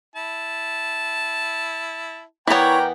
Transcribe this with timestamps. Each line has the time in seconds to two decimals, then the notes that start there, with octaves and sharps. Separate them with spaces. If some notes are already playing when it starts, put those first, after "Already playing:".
0.16 E4 A5
2.48 E3 B3 E4 A#4 C#5 D5 G5 A#5